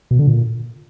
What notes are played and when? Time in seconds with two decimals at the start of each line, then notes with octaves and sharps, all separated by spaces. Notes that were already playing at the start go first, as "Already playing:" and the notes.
0.11 B2
0.19 D3
0.27 A#2